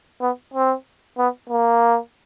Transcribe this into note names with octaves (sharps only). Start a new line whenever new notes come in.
B3
C4
B3
A#3